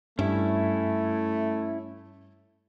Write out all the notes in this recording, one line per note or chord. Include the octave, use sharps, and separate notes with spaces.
G2 A3 C#4 E4